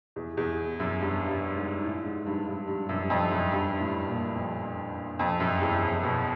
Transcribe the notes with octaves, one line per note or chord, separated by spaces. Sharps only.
E2
E2
F#2
G2
G2
G#2
A2
G#2
G2
G2
G2
F#2
F2
F#2
G2
A2
A#2
F2
F2
F#2
E2
F2
B2